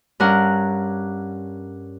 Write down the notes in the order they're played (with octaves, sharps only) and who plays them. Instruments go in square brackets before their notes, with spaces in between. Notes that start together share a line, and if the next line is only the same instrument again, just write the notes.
[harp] G2 C#4 A#4 F#5